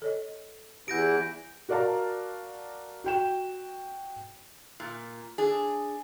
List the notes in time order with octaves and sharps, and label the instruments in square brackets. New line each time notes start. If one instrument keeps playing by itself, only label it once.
[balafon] A4 C#5 D#5
[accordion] E2 E3 [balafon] G4 F#5 [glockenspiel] G6 A#6 D7
[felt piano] F#4 A#4 D5 F5 A5 A#5
F#4 G5 E7
[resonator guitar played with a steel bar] A#2
D4 G#4